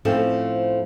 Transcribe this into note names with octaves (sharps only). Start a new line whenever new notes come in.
A2 F3 A3 C4 C#4 A4